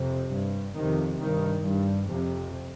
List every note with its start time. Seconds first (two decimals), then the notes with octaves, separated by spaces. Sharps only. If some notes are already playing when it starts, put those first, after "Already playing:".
Already playing: F2 C3
0.31 G2
0.75 F2 C3 D#3
1.19 G2 D#3
1.63 G2
2.07 F2 C3